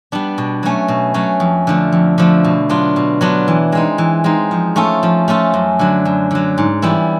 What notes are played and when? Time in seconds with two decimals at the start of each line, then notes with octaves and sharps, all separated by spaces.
0.12 G3 B3 D4
0.38 B2
0.63 F#3 A3 C#4
0.88 B2
1.14 F#3 A3 C#4
1.40 F2
1.67 D3 F3 A3
1.92 F2
2.18 D3 F3 A3
2.44 B2
2.69 F#3 B3 D4 F4
2.96 B2
3.21 F#3 B3 D4 F4
3.48 E3
3.72 G#3 C4 D#4
3.98 E3
4.24 G#3 C4 D#4
4.51 F3
4.76 A3 C#4 F4 A4
5.03 F3
5.28 A3 C#4 F4 A4
5.54 F#2
5.79 D3 F#3
6.05 F#2
6.31 D3 F#3
6.58 G#2
6.82 E3 G3 B3 E4